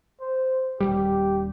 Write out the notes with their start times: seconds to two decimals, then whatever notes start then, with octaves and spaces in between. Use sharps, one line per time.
0.21 C5
0.80 D#1 B1 G3 G4